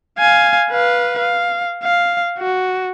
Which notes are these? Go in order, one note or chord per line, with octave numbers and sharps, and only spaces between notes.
F5 G#5
B4 F5
F5
F5
F#4